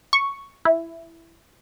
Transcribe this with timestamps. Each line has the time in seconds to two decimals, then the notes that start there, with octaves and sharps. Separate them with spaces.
0.13 C#6
0.65 E4